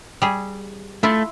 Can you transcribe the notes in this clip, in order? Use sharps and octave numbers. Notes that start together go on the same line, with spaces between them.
G3 G#4
A3 E4 F4